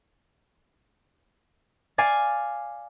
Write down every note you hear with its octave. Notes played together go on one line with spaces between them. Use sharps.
D5 F5 G#5